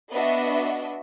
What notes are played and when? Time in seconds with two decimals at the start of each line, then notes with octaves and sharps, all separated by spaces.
0.12 B3 D4 F#4 D#5 E5